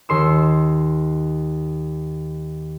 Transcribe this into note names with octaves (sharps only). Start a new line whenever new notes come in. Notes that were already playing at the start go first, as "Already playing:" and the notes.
D#2 C6 E6